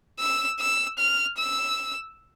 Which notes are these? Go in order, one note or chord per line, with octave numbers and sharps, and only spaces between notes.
E6
E6
F6
E6